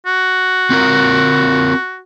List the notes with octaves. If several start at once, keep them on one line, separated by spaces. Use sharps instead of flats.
F#4
C4 F4 A#4